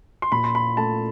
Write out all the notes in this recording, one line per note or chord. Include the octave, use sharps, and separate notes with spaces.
C6
A#2 B5
C6
B5
A3 A5